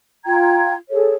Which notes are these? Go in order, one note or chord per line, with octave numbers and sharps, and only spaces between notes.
F4 G5 A#5 G#6
G#4 A4 C#5